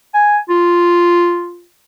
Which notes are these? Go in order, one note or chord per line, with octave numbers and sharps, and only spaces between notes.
G#5
F4